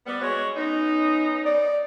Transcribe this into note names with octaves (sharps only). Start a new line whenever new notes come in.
G3 B3
G#3 F#4 C#5
B3 C#4 D#4
D5